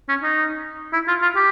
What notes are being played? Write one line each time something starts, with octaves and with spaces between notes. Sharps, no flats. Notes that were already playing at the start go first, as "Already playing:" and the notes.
C#4
D#4
E4
F4
F4
G4